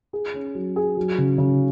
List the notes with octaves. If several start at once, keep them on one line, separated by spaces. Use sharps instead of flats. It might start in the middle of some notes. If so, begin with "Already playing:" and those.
G#4
C#4
F#3
G#4
F#3
C#3
C#3